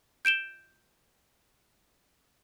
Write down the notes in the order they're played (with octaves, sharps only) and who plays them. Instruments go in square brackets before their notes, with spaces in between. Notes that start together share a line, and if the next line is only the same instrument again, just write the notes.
[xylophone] G6 D7 E7 G7